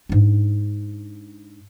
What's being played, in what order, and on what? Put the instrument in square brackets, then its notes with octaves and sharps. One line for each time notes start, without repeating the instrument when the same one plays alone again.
[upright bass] G#2 D4